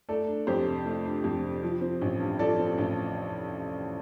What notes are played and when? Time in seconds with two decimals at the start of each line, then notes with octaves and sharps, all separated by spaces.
0.09 A3 A4 D5
0.28 D4
0.47 F2 G4 C5
0.66 C3
0.86 A3
1.05 D4
1.24 F2
1.43 C3
1.63 F3
1.81 C4
2.01 A1
2.20 G2
2.39 F3 A4 D5
2.59 C4
2.78 A1